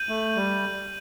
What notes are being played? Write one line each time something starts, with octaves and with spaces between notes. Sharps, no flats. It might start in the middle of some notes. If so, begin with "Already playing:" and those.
Already playing: G6 D#7 F#7
A3
G3